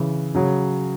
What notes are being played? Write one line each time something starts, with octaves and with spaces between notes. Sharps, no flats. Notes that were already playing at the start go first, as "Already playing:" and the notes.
Already playing: C#3 E3
C#3 F#3